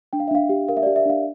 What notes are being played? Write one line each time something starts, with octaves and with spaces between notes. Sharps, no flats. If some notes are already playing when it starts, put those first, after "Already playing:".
D4 G5
F5
E5
D4 F5
G4
A#4 F5
E5
G4 D5
E5
D4 F5